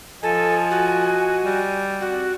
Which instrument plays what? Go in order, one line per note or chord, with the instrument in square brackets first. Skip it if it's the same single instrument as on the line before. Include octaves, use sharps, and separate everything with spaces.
[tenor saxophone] F3 [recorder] A4 [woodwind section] D#5 G#5
[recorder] F#4
[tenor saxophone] G3
[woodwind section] C4 D5 [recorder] F#4